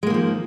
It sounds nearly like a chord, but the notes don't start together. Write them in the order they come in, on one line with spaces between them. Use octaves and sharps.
G#3 A#3 D#3 F3